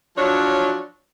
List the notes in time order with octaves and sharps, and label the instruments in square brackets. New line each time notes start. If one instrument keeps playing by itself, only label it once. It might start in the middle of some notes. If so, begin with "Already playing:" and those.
[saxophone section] F3 F#3 D4 C#5